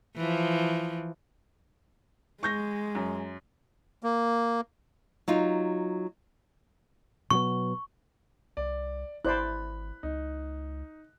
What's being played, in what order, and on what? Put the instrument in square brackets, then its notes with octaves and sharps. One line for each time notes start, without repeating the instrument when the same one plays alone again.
[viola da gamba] E3 F3
[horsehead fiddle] G#3 [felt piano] C#6 G6 A#6
[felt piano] F#2
[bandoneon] A#3
[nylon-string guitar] F#3 D#4 F4
[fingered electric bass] B2 F#3 B3 [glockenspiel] C#6
[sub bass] C2 [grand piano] D5
[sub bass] G#1 [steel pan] E4 C5 D5 [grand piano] B5 F#6
[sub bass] C#2 [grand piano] D#4